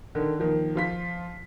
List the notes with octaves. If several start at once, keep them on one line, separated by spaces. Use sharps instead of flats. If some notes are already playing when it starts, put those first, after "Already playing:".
D3 D#3
D#3 F3 A#3
F3 F4 B6